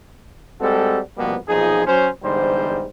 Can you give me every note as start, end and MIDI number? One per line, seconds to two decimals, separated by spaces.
0.61 0.99 55
0.61 0.99 56
0.61 0.99 60
0.61 0.99 66
0.61 0.99 69
1.18 1.36 36
1.18 1.36 47
1.18 1.36 53
1.18 1.36 55
1.18 1.36 58
1.18 1.36 59
1.48 1.84 35
1.48 1.84 46
1.48 1.84 53
1.48 1.84 63
1.48 1.84 68
1.87 2.09 54
1.87 2.09 61
1.87 2.09 72
2.23 2.86 40
2.23 2.86 44
2.23 2.86 50
2.23 2.86 55
2.23 2.86 72